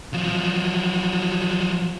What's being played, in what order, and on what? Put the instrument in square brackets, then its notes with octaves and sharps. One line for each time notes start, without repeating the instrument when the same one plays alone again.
[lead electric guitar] F3 F#3